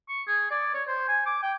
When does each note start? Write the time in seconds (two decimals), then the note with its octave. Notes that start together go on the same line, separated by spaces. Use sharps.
0.09 C#6
0.28 G#4
0.51 D5
0.74 C#5
0.88 C5
1.09 G#5
1.26 D6
1.43 G5